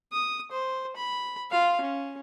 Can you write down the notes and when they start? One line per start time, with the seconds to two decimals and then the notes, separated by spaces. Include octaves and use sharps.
0.12 D#6
0.52 C5
0.96 B5
1.51 F4 F5
1.81 C#4